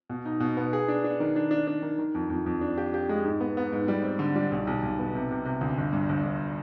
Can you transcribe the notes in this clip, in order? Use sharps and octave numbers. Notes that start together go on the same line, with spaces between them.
B2
D#4
B2
B3
G#4
D4
D4
D#3
D4
D4
D4
D#3
D#3
F2
F2
F2
D4
G4
G4
G#3
G#2
B3
B3
G#2
G3
C4
D3
G3
B1
B1
B1
B3
C3
C3
C3
D2
G1
G2
G1
G1